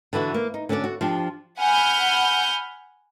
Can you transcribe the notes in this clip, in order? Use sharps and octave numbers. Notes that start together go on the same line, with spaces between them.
D3 E3 E4 F#4
A#3
D#4
D3 C#4 F#4 A4 D5
F#4
F3 D4 G4
F#5 G#5 B5 F6 G6